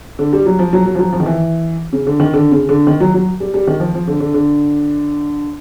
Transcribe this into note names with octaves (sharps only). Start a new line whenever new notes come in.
D3
G3
F#3
F3
F#3
F#3
F3
F#3
F3
D#3
E3
C#3
D3
D#3
D3
C#3
D3
D#3
F#3
F#3
G3
G3
D#3
F3
F3
D3
D3
D3